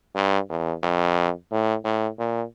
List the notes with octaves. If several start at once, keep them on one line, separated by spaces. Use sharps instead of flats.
G2
E2
F2
A2
A2
A#2